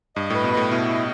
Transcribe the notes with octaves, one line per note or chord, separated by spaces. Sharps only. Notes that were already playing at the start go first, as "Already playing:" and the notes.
G2 D#5
A2 B4
B2
A2 D#5
B2 E4
D#5